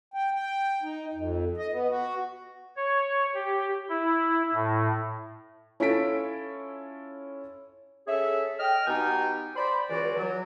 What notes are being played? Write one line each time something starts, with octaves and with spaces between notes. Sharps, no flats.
G5
G5
D#4
F2
D#5
B3
F#4
C#5
G4
E4
A2
C#4 E4 F4 A4 B6 D7
C#4 G#4 A4 E5
D#5 G5 F6
B2 B3 D#4 G4 G5 G#5
C5 D5 B5
C#2 E3 F#4 D5
F#3